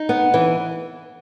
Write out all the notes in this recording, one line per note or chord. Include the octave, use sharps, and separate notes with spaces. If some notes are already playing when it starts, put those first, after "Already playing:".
Already playing: D#4
B3
E3